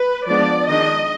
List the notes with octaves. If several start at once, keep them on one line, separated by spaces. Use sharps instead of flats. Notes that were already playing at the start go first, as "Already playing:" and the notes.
Already playing: B4
F3 G#3 B3 D4 D5
D#3 G#3 D4 D#5